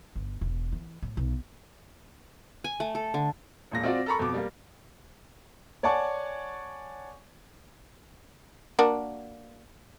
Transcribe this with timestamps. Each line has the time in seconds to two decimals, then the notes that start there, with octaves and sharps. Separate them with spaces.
0.15 G1
0.41 E1
0.72 E3
1.02 A2
1.17 B1
2.64 G#5
2.80 A3
2.95 A4
3.14 D3
3.71 E1 A#2 A#6
3.83 C4 F4 F#4 D5
4.06 A4 A#4 A#5 B5 C#6
4.19 F2 B2 D6
4.34 G3 A#3
5.83 C#5 D5 F#5 G#5 A5 C#6
8.79 A#3 D4 F#4